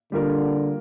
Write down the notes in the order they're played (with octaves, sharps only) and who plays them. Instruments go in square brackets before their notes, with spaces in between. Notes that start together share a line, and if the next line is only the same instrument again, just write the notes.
[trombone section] D3 [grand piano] G3 A#3 F4 A#4